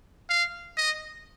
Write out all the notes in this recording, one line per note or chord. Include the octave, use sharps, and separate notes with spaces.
F5
D#5